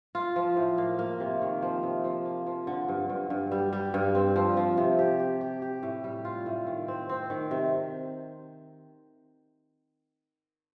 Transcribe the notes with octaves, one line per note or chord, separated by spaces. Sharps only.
F4
F3
A2
A#3
A#3
C3
D#3
F3
C3
F3
A#3
F3
D3
G2
G2
G2
G3
G3
G2
C4
F3
F3
C3
G4
G4
G4
G4
A2
G3
F4
A2
D#3
C4
C4
D#3
C3